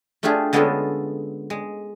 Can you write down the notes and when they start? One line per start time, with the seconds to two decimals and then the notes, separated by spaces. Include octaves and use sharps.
0.23 A3 D4 F4 G4 G#4
0.53 D3 G#3 B3 C#4 F4 A4
1.50 G#3